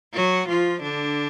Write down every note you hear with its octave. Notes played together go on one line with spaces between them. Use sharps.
F#3 F#4
F3 F4
D3 D4